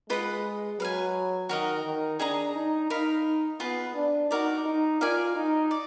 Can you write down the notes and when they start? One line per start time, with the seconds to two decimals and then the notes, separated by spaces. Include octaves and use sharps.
0.10 G#3 F4 B4 D#5 F#5
0.80 F#3 B4 F5
0.84 G#5
1.49 D#3 F#4 A#4 D#5
1.85 D#3
2.19 D4 G#4 D#5 A#5
2.55 D#4
2.90 D#4 A#4 F5 B5
3.60 B3 F4 G#4 B4
3.95 D4
4.31 D#4 F#4 A#4 D5
4.66 D#4
5.01 F4 A#4 D5 F5 G#5
5.36 D#4
5.71 D5